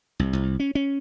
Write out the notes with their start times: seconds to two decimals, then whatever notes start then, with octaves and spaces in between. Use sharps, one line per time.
0.19 C2
0.33 C2
0.60 C#4
0.75 C#4